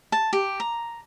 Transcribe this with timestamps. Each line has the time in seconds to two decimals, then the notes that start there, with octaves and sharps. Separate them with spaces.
0.12 A5
0.33 G4
0.60 A#5